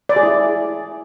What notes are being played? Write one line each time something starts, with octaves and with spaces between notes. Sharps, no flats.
D5
G#4
E4